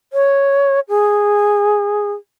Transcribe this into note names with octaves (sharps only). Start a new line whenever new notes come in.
C#5
G#4